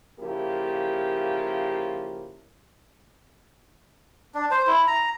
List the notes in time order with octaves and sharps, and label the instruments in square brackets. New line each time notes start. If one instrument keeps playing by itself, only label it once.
[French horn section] C#3 F3 A#3 E4 G4
[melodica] D4
C5
E4
A#5